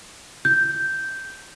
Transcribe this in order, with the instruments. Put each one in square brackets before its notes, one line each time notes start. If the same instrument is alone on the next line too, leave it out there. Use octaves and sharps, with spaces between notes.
[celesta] G6